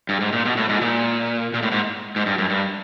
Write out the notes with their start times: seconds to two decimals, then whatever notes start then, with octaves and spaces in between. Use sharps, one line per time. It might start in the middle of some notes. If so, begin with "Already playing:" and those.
0.09 G2
0.21 G#2
0.32 A#2
0.45 B2
0.57 A2
0.69 G#2
0.81 A#2
1.54 A#2
1.63 A2
1.72 G#2
2.16 G#2
2.26 G2
2.38 F#2
2.50 G2